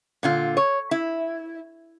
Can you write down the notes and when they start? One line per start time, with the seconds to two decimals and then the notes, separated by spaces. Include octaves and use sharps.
0.23 A#2 D3 F4
0.57 C#5
0.91 E4